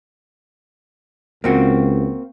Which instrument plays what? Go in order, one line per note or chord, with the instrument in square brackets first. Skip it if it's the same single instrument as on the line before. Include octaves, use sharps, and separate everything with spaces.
[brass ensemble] C#2 [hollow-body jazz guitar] A#3 C4 F#4